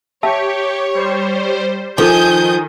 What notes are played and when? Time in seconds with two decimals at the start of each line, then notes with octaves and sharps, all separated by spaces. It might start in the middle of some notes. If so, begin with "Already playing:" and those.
0.23 G4 C#5 E5 A5 E6
0.95 G3 C5
1.98 D#3 F3 D#4 A4 G#5 D6 D#6 G6